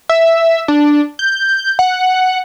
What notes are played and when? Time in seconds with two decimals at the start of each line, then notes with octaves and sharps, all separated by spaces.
0.09 E5
0.68 D4
1.19 G6
1.79 F#5